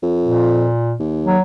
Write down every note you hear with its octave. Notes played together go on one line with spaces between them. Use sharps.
F2
A#2
D#2
F#3